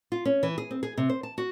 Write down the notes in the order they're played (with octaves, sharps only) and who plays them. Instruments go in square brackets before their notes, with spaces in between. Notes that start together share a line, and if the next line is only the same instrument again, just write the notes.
[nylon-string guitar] F4
C#4
E3
G#4
C4
G#4
C3
C5
A5
F#4